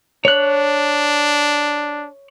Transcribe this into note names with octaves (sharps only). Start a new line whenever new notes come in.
D4 C#5 F#6